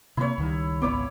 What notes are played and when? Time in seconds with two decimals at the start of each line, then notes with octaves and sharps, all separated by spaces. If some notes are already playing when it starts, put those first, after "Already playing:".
0.17 C3 A#3 E4 C#5
0.38 C#2 D#3 G3
0.82 G#1 C#2 B3 E4 C#5 D6